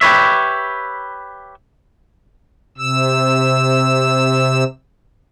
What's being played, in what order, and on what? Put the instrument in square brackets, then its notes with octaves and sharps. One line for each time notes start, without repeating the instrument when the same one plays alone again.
[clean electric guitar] G4 B4 C#5 E5
[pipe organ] C3 E6